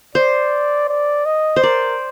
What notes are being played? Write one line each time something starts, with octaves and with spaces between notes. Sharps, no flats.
C5 D5
D5
D#5
C5
A#4 D5